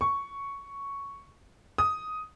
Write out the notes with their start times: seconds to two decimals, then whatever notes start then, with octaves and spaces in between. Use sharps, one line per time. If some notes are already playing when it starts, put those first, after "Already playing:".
0.01 C#6
1.78 D#6